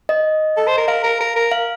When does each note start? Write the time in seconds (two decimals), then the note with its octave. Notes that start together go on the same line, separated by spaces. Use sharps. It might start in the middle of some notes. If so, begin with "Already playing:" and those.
0.09 D#5
0.57 A4
0.67 C5
0.77 A#4
0.88 A#4 F5
1.04 A#4
1.20 A#4
1.36 A#4
1.51 F5